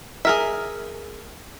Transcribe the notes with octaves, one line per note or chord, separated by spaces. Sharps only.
G#4 A#4 E5